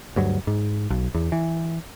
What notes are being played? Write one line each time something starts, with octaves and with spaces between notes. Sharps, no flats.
D2 G2 F#3
G#2
B1
E2
E3